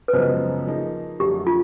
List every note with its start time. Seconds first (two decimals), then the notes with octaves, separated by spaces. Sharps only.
0.08 B4
0.13 F#2 C#3 F3 G#3 B3 C5
0.67 F3 A#3 D#4 G#4
1.20 F#2 D3 F3 A3 G4
1.47 F4